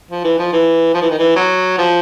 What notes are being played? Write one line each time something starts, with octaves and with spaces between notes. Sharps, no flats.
F3
E3
F3
E3
F3
E3
D#3
E3
F#3
F3